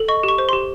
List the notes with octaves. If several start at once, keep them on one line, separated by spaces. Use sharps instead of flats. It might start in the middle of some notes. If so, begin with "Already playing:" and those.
Already playing: A4
D#5 C#6
G4
C#6
C5
G4 C6